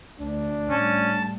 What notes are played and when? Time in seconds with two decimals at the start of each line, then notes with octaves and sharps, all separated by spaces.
0.20 D2 D4
0.70 A2 G3 C#4 A5